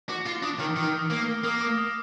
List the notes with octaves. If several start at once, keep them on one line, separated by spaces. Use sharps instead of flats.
F#4 D6
F4 D6
D4 D#6
D#3 F6
D#3 D#6
D#6
A#3
F6
F6
A#3 D#6
D6
D#6